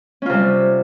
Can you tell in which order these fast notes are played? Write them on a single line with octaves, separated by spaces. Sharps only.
C#4 F4 C3 G3